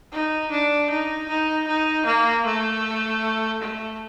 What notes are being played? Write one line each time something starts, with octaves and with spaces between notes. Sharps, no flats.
D#4
D4
D#4
D#4
D#4
A#3
A3
A3